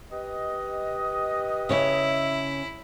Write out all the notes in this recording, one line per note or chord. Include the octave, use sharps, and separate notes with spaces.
G4 B4 D#5
C#3 E4 C#5 E5